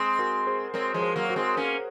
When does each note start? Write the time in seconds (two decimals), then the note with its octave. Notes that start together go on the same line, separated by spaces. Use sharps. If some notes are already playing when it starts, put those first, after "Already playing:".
Already playing: G#3 C4
0.19 F#4 A#4
0.47 G#4 C5
0.74 G#3 C4 A#4 C#5
0.94 F3 G#3
1.02 G#4 C5
1.16 F#3 A#3
1.30 F#4 A#4
1.36 G#3 C4
1.57 A#3 C#4